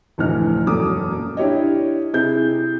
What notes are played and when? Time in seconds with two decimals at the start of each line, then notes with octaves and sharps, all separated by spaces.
0.18 F1 D2 A2 E3 D#4 F6
0.67 E1 F#2 A#2 A4 D6 D#6
1.37 D4 E4 G4 C#5 D#5
2.13 C3 D#4 E4 G#4 G6